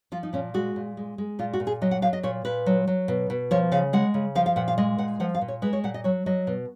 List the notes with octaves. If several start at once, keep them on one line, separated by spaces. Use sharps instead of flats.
F3 F4
D#4
A#2 C#4
G#3 F#4
A#2
G#3
G#3
A#2 F4
F#4
A#2
G#4
F#3 D#5
F#5
F#3 F5
D#5
A#2 C#5
A#2 B4
F#3
F#3
B2
B2
F3 C#5
C#3 F5
G#3 F#5
C#3
F3 F5
F5
A#2 F#5
F5
G#3 D#5
A#2 F#5
F3 F#5
F5
A#2
C#5
G#3 B4
C#5
A#2 F#5
D#5
F#3 C#5
F#3 D#5
B2